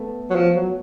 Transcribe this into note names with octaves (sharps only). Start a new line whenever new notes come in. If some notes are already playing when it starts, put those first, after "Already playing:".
Already playing: A3 B3
F#3
F3
F#3